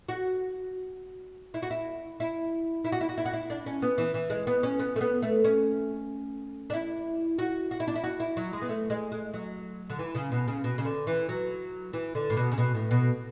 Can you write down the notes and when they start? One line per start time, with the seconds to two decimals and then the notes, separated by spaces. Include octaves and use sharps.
0.09 F#4
1.54 E4
1.62 F#4
1.70 E4
2.20 E4
2.85 E4
2.92 F#4
3.01 E4
3.09 F#4
3.18 E4
3.25 F#4
3.33 E4
3.50 D4
3.66 C#4
3.82 B3
3.98 E3
4.14 E3
4.30 G#3
4.47 B3
4.63 C#4
4.79 B3
4.96 A3
5.01 B3
5.22 A3
5.44 C#4
6.70 D4
6.74 E4
7.38 F#4
7.71 F#4
7.80 E4
7.87 D4
7.95 E4
8.04 F#4
8.20 E4
8.37 F#3
8.53 G#3
8.62 B3
8.69 A3
8.90 G#3
9.12 G#3
9.34 F#3
9.90 D3
9.99 E3
10.15 C#3
10.32 B2
10.48 C#3
10.64 B2
10.78 C#3
10.85 D3
11.07 E3
11.29 F#3
11.93 E3
12.15 D3
12.30 A2
12.37 B2
12.52 C#3
12.58 B2
12.74 A2
12.91 B2